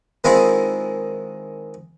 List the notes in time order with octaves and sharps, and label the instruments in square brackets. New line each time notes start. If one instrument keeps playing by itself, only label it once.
[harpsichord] D#3 G#3 C4 E4 F4 G#4